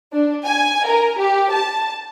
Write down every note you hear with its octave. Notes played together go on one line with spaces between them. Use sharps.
D4
G#5
A#4
G4
A5